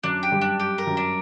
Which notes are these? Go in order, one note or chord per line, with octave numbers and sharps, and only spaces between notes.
F#2 D4
G4
G2
D4
G4
A#4
F#2
D4